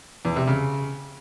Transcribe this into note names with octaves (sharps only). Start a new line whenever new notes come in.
E2
C3
C#3